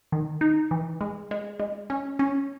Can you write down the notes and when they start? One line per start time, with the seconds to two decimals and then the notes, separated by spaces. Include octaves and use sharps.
0.12 D#3
0.41 D#4
0.71 E3
1.01 G#3
1.31 G#3
1.60 G#3
1.90 C#4
2.19 C#4